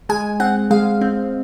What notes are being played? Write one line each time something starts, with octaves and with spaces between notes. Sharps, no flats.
G#3 G#5
C4 F#5
G#3 F5
C4